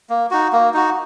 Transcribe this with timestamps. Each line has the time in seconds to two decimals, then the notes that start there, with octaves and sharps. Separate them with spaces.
0.09 A#3
0.31 D#4 F#4
0.52 A#3
0.74 D#4 F#4